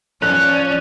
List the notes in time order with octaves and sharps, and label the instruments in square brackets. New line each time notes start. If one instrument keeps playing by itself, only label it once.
[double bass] F3 [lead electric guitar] C#4 [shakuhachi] D5 [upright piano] F#6